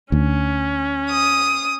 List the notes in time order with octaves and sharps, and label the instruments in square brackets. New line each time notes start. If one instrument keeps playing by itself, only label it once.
[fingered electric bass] D2 [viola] C#4
[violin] D#6